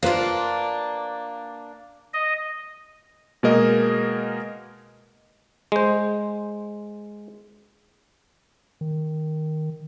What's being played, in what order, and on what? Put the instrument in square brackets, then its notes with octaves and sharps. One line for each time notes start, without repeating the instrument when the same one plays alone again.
[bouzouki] A#3 D4 [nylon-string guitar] F4 B4 C5
[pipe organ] D#5
[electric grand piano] B2 G#3 A#3 A#4 D#5
[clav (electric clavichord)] G#3 C5
[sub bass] D#3